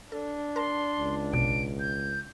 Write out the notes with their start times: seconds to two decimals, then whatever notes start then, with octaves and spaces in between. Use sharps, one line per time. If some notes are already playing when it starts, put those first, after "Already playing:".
0.12 D4 A4
0.56 A#4 A5 C6
1.00 C#2
1.33 A#1 F2 B2 D7
1.80 G6